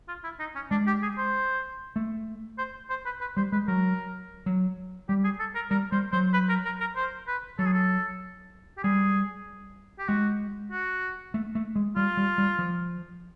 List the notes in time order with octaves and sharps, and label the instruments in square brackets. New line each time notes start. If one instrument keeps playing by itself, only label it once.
[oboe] F4
E4
D#4
C#4
[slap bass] G#3 [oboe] D4
[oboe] G4
G#4
C5
[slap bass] A3
[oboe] C5
C5
B4
B4
[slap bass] G3 [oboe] C5
[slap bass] G#3 [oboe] B4
[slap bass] F#3 [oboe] A#4
[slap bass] F#3
[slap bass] G3 [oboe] G4
[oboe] G#4
A4
A#4
[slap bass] G3 [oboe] A#4
[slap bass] G3 [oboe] C5
[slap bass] F#3 [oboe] C5
[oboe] B4
A#4
A#4
A#4
C5
B4
[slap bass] F#3 [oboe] A4
[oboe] G#4
A4
G4
[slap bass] G3 [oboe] G#4
[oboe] G4
[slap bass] G#3 [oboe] F#4
[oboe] F#4
[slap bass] A3
A3
G#3
[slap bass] G3 [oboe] F4
[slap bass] G3
G3
F3